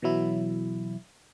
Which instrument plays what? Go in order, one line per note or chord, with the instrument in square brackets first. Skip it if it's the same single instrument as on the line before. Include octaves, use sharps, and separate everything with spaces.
[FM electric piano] B2 E3 F#3 E4